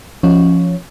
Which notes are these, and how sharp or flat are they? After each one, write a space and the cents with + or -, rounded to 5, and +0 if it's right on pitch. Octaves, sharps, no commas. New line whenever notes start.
F3 -5 C#4 +0